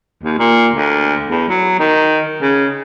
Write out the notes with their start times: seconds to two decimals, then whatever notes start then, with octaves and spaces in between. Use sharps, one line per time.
0.23 D#2
0.38 A#2
0.74 D2
1.28 E2
1.49 F#3
1.79 D#3
2.42 C#3